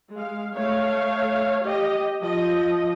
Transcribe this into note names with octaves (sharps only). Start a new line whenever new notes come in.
G#3 F5
A3 C#5 F5
G4 D#5
F3 D#5